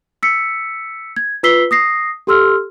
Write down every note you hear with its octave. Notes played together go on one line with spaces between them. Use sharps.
E6 B6 C#7
G#6
F4 B4 E6 B6 C7 G7
D#6 A#6 C7
G4 A4 C6 E6 F6